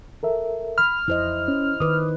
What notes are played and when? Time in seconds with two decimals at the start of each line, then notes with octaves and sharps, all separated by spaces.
0.23 A4 A#4 E5
0.78 B5 F6
1.08 F2 E4 C5 D#5
1.48 C#4
1.80 D#3 B4 D6 D#6